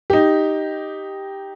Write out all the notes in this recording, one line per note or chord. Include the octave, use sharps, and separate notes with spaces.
D#4 G4